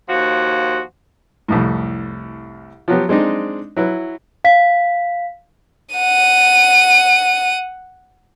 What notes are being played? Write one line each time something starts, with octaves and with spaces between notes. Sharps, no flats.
D#2 F3 F#4
C2 F2 A2
F3 F#3 B3 G4
G#3 C4 D4 D#4
F#3 E4 B4
F5 B6
F#5 D#7